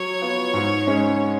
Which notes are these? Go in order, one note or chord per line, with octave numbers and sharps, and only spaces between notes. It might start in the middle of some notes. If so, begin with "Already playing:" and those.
Already playing: F#3 C#5
B3 F4
G#2
G#3 C#4